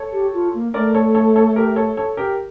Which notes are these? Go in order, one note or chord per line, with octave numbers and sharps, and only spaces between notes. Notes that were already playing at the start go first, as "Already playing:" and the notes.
Already playing: A4 C#5
G4
F4
A#3
A3 A#4 D5
A4 C#5
A4 C#5
A4 C#5
G4 A#4
A4 C#5
A4 C#5
G4 A#4